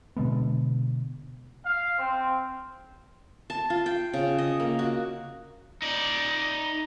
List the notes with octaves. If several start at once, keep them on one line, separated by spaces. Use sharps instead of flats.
B2 D3 G#3 B3
F5
C4
A5
F4
G5
C#3
D#5
A#3
F#4
D#4 D5